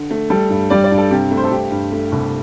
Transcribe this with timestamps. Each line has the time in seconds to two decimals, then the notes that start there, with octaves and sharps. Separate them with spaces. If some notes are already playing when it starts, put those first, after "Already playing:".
Already playing: D3
0.11 A3
0.30 G3 A4
0.50 G2
0.70 G3 D5
0.84 D5
0.91 G2
0.98 A4
1.11 C3 G4
1.31 A3
1.37 C5
1.44 A4
1.51 G2 G4
1.71 G2
1.92 A3
2.12 C2